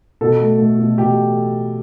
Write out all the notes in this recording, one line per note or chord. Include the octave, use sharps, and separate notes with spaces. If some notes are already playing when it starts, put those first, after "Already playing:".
B2 A4
A3
A3
B2
B2 G4